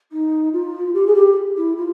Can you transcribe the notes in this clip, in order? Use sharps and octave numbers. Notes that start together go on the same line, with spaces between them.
D#4
F4
G4
G#4
G4
E4
F4